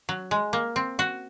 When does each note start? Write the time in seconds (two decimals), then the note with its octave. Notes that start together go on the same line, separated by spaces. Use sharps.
0.09 F#3
0.31 G#3
0.53 A#3
0.76 C4
0.99 F#4